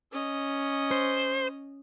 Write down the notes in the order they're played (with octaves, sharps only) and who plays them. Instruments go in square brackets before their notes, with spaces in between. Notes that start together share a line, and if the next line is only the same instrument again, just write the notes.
[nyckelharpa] C#4 D#5
[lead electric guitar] C5